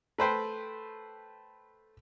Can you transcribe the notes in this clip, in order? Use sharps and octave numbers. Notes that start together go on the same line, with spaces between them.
A3 B4 C5 G5